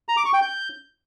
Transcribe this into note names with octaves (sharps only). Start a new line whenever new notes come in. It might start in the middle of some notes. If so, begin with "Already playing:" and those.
A#5
D6
C#6
G5
G6